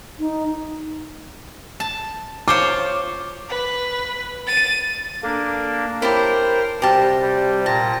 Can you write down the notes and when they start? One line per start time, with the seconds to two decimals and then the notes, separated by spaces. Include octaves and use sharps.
0.19 D#4
1.80 A5
2.48 F4 C5 C#5 D6
3.49 B4
4.47 A6 D#7
5.23 A#3 D4 A4
6.02 E4 G4 A#4 C5 C#5 A5 B5
6.82 C3 G3 F#4 G4 G5 A5 A#6
7.21 G3
7.66 A#2 G5 A5 A#6